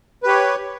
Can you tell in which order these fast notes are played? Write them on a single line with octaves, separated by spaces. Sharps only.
B4 G4 C#5